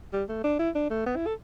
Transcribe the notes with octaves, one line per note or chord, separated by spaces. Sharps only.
G3
A3
D4
E4
D4
A3
B3
E4
A4